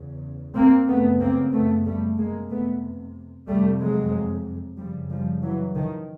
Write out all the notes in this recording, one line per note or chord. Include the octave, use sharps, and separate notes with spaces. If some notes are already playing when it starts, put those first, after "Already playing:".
Already playing: E2 C#3
A#3 C4
F#2 C#3 A3 B3
A#3 C4
A3 B3
G3 A3
F2 C3 G#3 A#3
A3 B3
F2 C3 G3 A3
F#3 G#3
F#2 C#3 F3 G3
F3 G3
E3 F#3
D#3 F3